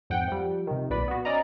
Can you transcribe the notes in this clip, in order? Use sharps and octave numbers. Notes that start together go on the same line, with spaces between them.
F2 G#2 F#5 G5
F3 G3
C3 D#3
B1 A#2 B4 D5 B5
B3 F#4
C#4 D5 D#5 A#5